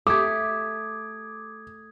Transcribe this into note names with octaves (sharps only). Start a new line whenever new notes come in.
A3 G4 D6 D#6 G#6